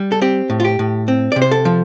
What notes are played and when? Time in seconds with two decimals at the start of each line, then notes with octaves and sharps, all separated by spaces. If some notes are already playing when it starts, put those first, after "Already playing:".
Already playing: G3
0.12 A4
0.21 C4 G4
0.50 A2
0.60 F4
0.65 G4
0.79 A2
1.08 C4
1.32 C3 D5
1.42 C5
1.51 A4
1.65 F3